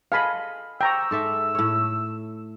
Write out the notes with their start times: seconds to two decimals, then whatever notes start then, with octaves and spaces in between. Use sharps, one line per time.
0.12 G#4 A4 D#5 F5 G#5 B5
0.81 G5 A#5 C#6 E6
1.11 G#2 A4 E5 D6
1.55 A2 C#5